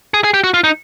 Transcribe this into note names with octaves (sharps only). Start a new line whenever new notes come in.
G#4
G#4
G4
F#4
F4
D#4